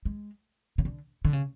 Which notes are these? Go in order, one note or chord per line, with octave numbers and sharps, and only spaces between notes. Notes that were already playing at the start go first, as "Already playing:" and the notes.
G#3
C#3
D3
D3
C#3